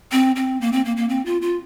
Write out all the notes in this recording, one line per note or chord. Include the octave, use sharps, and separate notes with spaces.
C4
C4
A#3
C4
A#3
A#3
C4
F4
F4